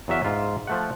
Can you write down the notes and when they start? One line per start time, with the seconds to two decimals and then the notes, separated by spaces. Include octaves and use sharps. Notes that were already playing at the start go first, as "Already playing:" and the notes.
0.08 E2 F#3 E5 F5
0.24 G#2 F4
0.67 F3 A3 F#5